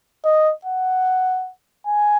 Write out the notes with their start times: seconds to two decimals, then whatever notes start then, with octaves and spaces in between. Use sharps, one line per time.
0.25 D#5
0.65 F#5
1.87 G#5